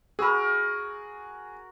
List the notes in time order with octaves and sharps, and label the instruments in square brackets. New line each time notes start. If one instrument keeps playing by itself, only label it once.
[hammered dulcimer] F#4 A#4 [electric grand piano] G#4 [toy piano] B5 E6